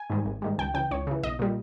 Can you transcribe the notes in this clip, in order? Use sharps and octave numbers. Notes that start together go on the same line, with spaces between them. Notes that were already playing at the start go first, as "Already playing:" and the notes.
Already playing: G#5
G#2 D#3 G3
G#1
G#2 D#3 G3
C#2 G5
C#3 E3 G5
C#2 C#5
C#3 E3
B1 D#5
A#2 G3